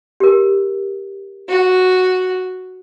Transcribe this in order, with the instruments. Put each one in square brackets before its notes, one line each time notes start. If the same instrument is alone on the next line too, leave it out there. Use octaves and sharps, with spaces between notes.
[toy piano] G4 A#4
[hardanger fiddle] F#4